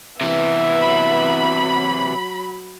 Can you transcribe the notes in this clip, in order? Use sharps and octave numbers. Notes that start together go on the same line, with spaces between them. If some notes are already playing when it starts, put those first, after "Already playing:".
C3 E3 B3 E5
F#3 B5